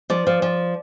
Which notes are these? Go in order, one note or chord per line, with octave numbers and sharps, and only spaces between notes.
F3 D5
F3
F3